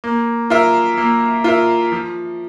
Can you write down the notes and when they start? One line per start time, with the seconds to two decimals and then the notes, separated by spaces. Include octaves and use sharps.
0.04 A#3
0.50 F4 A#4 E5
0.97 A#3
1.44 F4 A#4 E5
1.92 F3